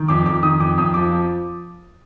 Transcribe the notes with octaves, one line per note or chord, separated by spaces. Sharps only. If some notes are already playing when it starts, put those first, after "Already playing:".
Already playing: D#3
F2 D6
F2 D6
D#3 D#6
F2 D6
F2 D#6
F3 D6
F3